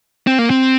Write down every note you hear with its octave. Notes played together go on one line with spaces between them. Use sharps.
C4
A#3
C4